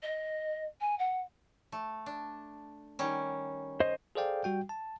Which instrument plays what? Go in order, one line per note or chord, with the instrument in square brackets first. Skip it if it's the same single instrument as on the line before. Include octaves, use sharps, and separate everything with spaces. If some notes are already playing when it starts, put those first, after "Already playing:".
[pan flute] D#5
G#5
F#5
[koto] A3
D4
D#3 G3 C#4
[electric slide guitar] C5 D#5
[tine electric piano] G#4 A4 C5 D5 F5 G5
G3 F#4 G5
A5